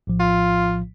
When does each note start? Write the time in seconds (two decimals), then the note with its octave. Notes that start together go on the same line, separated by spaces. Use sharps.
0.07 A#1 A2 F3
0.20 F4